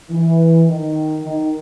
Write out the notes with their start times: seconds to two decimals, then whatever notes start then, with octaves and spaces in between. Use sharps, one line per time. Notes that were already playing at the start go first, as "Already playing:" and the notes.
0.10 E3
0.68 D#3
1.25 D#3